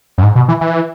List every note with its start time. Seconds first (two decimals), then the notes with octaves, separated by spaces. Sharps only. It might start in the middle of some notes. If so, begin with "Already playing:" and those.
0.18 F#2
0.23 G#2
0.35 B2
0.48 E3
0.61 E3